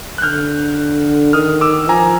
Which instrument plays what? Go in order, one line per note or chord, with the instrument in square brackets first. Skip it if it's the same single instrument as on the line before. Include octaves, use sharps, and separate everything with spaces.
[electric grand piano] F#6
[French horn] D3 [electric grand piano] F6 G6
[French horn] D#3 [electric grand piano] D#6 F6
[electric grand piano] D6 E6
[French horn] F3 [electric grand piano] G#5 A#5